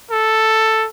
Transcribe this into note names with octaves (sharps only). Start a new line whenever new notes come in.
A4